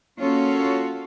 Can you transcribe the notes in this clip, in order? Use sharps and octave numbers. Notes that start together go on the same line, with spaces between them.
A#3 C#4 F4 F#4 A4 C#5